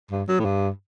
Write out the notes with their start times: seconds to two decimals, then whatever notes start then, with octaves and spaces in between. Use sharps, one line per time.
0.11 G2
0.28 F#3
0.39 A2
0.45 G2